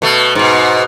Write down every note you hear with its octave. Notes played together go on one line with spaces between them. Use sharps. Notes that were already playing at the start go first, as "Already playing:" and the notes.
B2 A3
G#2 B2